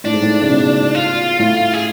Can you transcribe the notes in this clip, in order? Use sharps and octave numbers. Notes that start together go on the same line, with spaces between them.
A2 D4
G#2
A2
C#3
B2
F4
A2
G#4